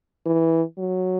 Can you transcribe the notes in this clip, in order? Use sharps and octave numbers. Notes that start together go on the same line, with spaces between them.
E3
F#3